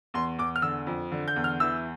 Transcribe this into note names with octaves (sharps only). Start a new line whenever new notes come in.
E2 C6
E2 D6
F6
D3 E6
F2
D3
G6
E2
F6
E3 E6